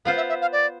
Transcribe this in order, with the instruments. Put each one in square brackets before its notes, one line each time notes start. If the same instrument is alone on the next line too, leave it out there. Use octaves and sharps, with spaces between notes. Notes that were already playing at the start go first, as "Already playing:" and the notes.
[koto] B3 F4 C5 [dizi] F5
[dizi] E5
E5
F5
D5